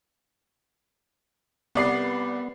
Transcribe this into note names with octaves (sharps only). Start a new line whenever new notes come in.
C2 B3 D5 C7